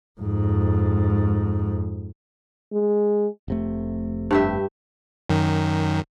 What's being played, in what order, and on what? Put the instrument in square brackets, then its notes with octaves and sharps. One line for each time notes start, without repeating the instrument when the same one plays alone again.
[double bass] F2 G#2
[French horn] G#3
[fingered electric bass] F1 C3 A3
[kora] G2 G4 E5
[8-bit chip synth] F#2 D#3